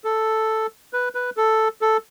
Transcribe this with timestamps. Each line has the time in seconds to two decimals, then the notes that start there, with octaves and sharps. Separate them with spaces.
0.04 A4
0.93 B4
1.15 B4
1.37 A4
1.82 A4